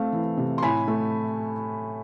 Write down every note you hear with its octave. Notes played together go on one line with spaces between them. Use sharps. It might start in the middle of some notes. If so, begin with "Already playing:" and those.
Already playing: A3 C4 F5
E3
C3
C6
A2 G#5 B5
A3